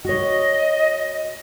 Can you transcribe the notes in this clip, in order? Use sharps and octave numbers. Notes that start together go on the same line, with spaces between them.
F#4 C#5 D#5